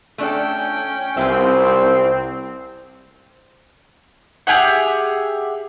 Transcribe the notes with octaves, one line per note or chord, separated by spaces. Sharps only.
A3 C#4 D4 A4 G5
C2 C4 F4 B4 E5
G4 G#4 E5 F#5